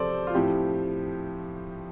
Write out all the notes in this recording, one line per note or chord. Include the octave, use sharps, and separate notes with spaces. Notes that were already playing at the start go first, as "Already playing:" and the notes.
Already playing: C3 F3 A4 C5 D5
F4
A2 F3 C4 G4